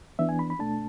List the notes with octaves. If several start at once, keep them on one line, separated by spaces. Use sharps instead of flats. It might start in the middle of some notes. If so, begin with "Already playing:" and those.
E3 B3 D4 E5
G#5
B5
B5
B2 A3 D4 A5